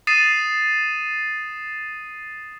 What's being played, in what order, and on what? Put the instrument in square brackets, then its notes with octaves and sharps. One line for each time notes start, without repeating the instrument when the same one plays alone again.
[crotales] D#6 A6 C7 D#7 E7